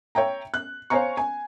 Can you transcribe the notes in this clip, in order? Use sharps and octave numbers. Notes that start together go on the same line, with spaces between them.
C#5 E5 G5 A#5
F#6
C5 C#5 F5 G#5 A#5 C#6
G#5